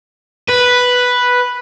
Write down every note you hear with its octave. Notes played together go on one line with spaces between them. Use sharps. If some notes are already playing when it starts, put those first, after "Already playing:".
B4